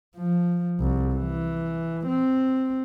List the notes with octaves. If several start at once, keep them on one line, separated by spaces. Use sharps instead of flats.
F3
C2
E3
C4